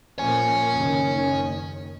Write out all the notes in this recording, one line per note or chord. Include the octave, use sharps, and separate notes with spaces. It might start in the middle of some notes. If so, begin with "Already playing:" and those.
A#2 F3 A#3 C#5 G#5
F#1 D#2 D#3